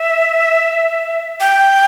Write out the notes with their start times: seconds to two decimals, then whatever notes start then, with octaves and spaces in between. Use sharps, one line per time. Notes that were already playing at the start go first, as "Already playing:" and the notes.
Already playing: E5
1.40 G5